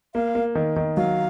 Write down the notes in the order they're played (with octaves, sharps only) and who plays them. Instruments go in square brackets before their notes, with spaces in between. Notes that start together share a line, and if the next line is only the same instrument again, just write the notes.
[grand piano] A#3 [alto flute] F5
[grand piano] A#3
D#3
D#3
[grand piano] F#3 [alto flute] F5